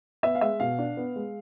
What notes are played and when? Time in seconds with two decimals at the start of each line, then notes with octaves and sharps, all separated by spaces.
0.23 B3 E5
0.35 F5
0.41 G#3 E5
0.60 B2 F5
0.79 D4
0.97 B3
1.16 G#3